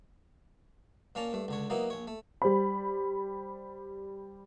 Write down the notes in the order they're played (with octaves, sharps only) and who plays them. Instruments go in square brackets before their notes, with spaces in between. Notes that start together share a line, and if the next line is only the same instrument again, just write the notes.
[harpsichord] A#2 A#3 C#4 A5 A#5
G2 A3
C#2 D3 C#5
F#3 A#3 B3 D#4 E4
A#1 C#5
A3
[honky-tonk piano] G3 C5 B5